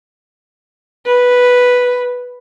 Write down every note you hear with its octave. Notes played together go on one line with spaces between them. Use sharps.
B4